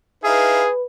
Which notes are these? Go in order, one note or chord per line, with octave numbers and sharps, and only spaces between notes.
D#4 E4 G#4 B4 F5